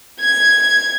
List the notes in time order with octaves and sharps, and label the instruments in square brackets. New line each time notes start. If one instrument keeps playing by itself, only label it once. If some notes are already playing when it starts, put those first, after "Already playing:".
[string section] G#6